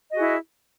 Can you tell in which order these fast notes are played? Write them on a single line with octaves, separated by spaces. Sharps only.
D#5 F#4 G#4 E4